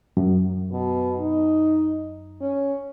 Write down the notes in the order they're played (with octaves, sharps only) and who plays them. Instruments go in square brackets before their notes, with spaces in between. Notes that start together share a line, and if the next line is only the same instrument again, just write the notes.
[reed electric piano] F#2
[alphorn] B2
D#4
C#4